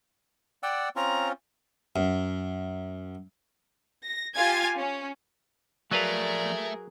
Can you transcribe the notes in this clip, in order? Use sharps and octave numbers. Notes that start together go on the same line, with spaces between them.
D5 F#5 G5 E6
C4 C#4 F4 A#5
F#2
A#6
F4 G4 F5 G#5 G#6 A6
C#4
F3 F#3 A3 G#4 A#4 B4 D5 F5